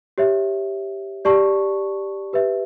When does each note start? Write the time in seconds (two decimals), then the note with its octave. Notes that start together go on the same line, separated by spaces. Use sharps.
0.18 G4 C#5 E5
1.25 G4 D5 A5 C#6
2.33 G4 B4 E5